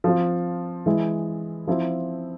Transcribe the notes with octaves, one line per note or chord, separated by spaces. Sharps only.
F3 C4 F4
E3 G#3 E4
F3 C4 E4